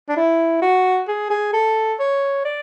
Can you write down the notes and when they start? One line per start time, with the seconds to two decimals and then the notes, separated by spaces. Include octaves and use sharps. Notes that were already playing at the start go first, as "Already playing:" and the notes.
0.09 D4
0.16 E4
0.62 F#4
1.08 G#4
1.30 G#4
1.53 A4
1.99 C#5
2.45 D5